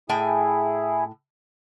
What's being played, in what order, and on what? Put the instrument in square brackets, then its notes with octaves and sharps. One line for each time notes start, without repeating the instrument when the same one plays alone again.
[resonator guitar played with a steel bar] A2 G5 G#5 [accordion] E4 G#4